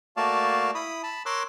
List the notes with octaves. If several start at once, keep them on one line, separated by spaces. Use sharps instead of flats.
A3 A#3 F#4 D5 F5 A5
E4 B5 D#6
A5 B5
A#4 C#5 C6 D6 E6 F#6